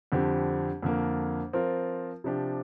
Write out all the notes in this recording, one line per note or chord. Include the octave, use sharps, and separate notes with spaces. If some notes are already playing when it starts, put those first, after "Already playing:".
F2 D3 G3 C4 G4
F2 D3 A#3
F3 C4 F4 A#4
C3 F3 D4 G4